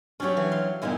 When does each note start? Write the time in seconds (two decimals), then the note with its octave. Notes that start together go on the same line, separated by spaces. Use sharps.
0.20 F#3 C#4 D4 G4 C#5
0.37 E3
0.52 F5 C6
0.82 G2 A#2 G#3 B3 D#4 E4